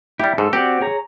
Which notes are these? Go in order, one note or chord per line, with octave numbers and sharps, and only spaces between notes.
G3 E4 G4
G#2 A4
C4 F#4 G4 D5
G#4 C#5 A#5